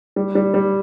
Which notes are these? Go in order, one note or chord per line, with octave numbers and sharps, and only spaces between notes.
G3
G3
G3